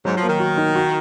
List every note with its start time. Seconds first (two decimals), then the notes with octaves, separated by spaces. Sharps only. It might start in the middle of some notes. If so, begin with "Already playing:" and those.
0.05 G#2 F#3
0.17 F3
0.23 A#3
0.28 D#3
0.40 F#4
0.58 D#4
0.76 F#4